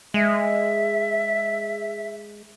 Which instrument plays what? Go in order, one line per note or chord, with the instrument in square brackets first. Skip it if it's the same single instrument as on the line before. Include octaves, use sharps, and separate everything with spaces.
[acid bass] G#3 [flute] E5